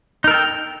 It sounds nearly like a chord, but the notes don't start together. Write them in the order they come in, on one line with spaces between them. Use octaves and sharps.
D#4 A#4 A4 G5